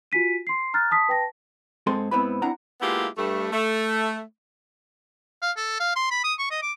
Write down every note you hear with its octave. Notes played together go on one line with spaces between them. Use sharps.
F4 F#4 G#5 B6 D#7
C6 C7
A#5 F6 F#6 A6
A5 D#6 B6
B4 G5 A5 A#6
G#2 C4 G#4 A4 C6
G#2 B3 C4 E4 B4 B5
C4 D4 E4 F#5 A#5
G#3 A#3 B3 E4 F4 G4
G2 A3
A3
F5
A4
F5
C6
B5
D#6
C#6
D#5
D6